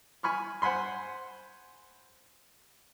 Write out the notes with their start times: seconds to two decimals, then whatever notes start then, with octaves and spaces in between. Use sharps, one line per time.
0.23 G#5 B5 C#6 F6
0.62 C5 F#5 G#5 B5 C6